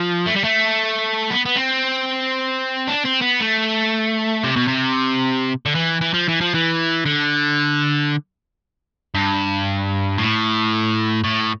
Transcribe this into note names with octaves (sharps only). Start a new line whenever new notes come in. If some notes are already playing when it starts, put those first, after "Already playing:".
Already playing: F3
A3
G3
A3
B3
B3
C4
D4
C4
B3
A3
C3
B2
C3
D3
E3
E3
F3
E3
F3
E3
D3
G2
A2
A2